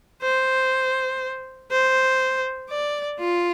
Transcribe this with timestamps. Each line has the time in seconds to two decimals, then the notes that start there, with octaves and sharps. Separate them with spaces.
0.22 C5
1.71 C5
2.70 D5
3.19 F4